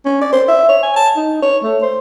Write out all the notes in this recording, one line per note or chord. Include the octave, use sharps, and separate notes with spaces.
C#4
D5
C5
E5
C#5
G#5
A5
D#4
C#5
A3
C5